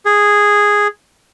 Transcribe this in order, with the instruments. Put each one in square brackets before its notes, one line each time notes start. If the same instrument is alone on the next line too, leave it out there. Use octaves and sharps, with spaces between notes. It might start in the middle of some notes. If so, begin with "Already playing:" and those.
[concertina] G#4